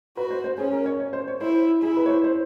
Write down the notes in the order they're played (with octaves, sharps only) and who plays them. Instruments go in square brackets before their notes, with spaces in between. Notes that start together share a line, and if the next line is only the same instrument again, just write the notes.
[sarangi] F#4 [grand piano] B4
[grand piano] C5
C5
[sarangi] C#4 [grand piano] G#4
[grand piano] A#4
C#5
C#5
C5
C#5
[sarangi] E4 [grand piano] C5
[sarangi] E4 [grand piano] G#4
[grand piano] B4
C#5
C5
C5